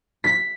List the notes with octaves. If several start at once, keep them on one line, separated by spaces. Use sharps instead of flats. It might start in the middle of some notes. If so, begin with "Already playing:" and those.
B6